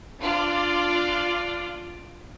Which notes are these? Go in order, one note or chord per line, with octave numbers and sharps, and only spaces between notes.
D4 F4 D5